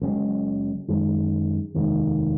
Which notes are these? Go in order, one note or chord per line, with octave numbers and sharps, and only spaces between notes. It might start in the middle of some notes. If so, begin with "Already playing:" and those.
F#1 F#2 C#3 G#3
F#2 D#3 G#3
F1 D#2 D#3 G#3